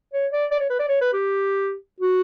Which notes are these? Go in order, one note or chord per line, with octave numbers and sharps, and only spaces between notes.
C#5
D5
D5
C#5
B4
D5
C#5
B4
G4
F#4